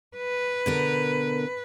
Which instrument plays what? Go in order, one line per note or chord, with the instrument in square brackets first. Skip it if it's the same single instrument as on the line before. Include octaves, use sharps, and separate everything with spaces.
[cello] B4
[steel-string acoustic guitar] B2 D3 A#4